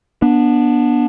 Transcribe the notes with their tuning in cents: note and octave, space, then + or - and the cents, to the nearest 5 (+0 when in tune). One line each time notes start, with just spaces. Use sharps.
B3 -25 D4 +0